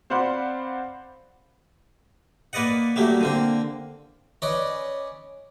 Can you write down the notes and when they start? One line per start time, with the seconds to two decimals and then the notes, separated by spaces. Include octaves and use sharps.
0.10 C4 C5 D5 F5 F#5 B5
2.53 A#3 B4 D5 D#5 F#5
2.96 F#3 G3 A3 A#3
3.21 D3 A#3 C4
4.42 C#4 B4 D5 D#5